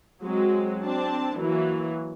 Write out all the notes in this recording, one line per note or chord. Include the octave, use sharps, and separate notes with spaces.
F#3 G#3 C4
C4 D4 A5
E3 F#3 A#3